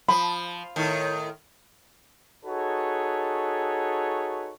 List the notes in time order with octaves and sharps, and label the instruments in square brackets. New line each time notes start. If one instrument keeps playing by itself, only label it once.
[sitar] F3 [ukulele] B5
[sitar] A2 D#3
[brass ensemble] D#4 F#4 G#4 A4 B4 C#5